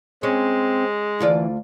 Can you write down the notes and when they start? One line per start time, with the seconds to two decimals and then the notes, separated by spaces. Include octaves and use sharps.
0.23 G#3 C4 C#4
1.20 D2 E3 F4 D5